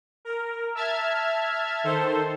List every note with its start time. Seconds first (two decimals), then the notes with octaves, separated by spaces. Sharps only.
0.25 A#4
0.75 E5 A5 F6 G#6
1.84 D#3 A4 C5